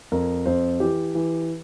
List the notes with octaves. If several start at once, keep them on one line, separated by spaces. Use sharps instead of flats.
F2 A#4
F2 C5
E3 G4
E3